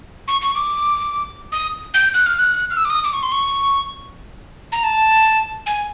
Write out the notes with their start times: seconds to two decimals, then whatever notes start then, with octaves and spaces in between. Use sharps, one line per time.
0.28 C#6
0.41 C#6
0.55 D6
1.52 D#6
1.94 G6
2.14 F#6
2.26 F6
2.39 F#6
2.71 F6
2.77 E6
2.85 D6
2.90 D#6
3.04 D6
3.13 C#6
3.23 C6
3.32 C#6
4.72 A#5
4.84 A5
5.66 G#5